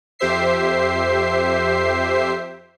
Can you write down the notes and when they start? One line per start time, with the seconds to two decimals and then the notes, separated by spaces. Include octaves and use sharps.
0.19 F2 G4 C5 E5 C7